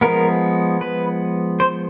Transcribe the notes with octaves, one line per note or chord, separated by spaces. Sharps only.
F3 G#3 B3 A#4
B4
C5